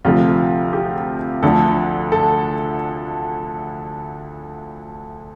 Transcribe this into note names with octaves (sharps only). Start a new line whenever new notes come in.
D2 C3 F3 A3 F4
G4
D2 D3 F3 A3 A4
A4